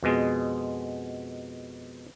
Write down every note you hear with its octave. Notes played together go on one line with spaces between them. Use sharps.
F2 B2 G#3